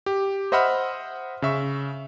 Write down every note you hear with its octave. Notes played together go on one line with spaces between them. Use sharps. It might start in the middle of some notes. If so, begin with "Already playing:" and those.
G4
C5 D#5 E5 F#5 B5 F6
C#3 E5 C#6